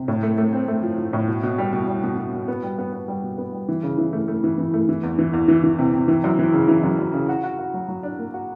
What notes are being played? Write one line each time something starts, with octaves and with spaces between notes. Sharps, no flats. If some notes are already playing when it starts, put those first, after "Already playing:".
Already playing: C3
A2
A3
A3
C4
A3
F3
F3
A2
B2
B2
G3
B2
G3
B2
B2
B2
B3
G3
B3
B3
G3
B2
B3
G3
E3
C#3
E3
A3
A3
E3
E3
A3
E3
E2
E3
E2
E3
E3
C3
C3
E3
F#2
E3
C#3
E3
F#2
F#2
C#3
F#4
F#4
F#4
F#3
F#3
D4
A#3
F#4